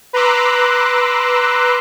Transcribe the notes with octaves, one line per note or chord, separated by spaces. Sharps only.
B4 A#5 C6 D6 E6 F#6